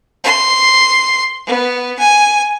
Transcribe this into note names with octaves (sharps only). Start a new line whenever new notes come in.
C6
B3
G#5